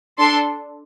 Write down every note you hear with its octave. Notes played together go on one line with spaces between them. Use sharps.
D4 A4 C6